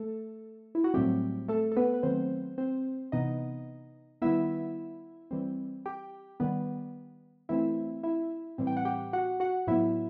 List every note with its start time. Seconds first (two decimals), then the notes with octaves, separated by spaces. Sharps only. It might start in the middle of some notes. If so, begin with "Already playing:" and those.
Already playing: A3 A4
0.75 E4
0.84 F#4
0.94 A2 F#3 G3 A3 C4 G4
1.48 A3 A4
1.72 A4
1.77 B3 B4
1.94 B4
2.03 D#3 F#3 A3 C4 C5
2.58 C4 C5
3.12 C3 E3 B3 D#4 D#5
4.22 D#3 G3 B3 E4 E5
5.31 E3 G3 C4
5.86 G4 G5
6.40 D#3 G3 B3
7.49 E3 A3 C4 E4 E5
8.03 E4 E5
8.58 A2 E3 G3 C4
8.67 G5
8.77 F#5
8.85 G4 G5
9.13 F#4 F#5
9.40 F#4 F#5
9.67 A2 F#3 B3 E4 E5